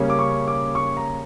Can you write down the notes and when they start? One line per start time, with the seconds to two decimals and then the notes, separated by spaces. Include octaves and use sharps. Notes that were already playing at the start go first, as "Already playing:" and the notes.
Already playing: C#3 G3 A#3 C#4
0.10 D6
0.19 C#6
0.47 D6
0.75 C#6
0.97 A#5